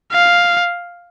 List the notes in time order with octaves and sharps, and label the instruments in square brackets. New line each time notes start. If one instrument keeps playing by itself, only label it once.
[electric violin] F5